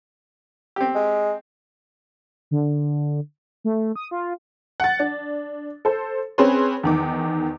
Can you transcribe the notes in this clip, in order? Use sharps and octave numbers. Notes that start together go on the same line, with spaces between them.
C4 G4
G#3
D3
A3
D#6
F4
F#5 A6
D4
A4 C5
C4 C#4 G#4 B4 C6
E2 D#3 D6